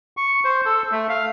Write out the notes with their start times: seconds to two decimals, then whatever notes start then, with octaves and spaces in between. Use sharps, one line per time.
0.17 C#6
0.45 C5
0.66 A4
0.92 A3
1.09 F5